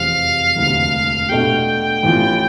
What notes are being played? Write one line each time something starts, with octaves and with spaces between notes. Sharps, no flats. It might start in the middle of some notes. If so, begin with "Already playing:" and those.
Already playing: F1 E2 C3 F3 F5
E1 D2 C3 E3 B3
B2 A3 D4 G4 G5
A1 A2 E3 B3 F4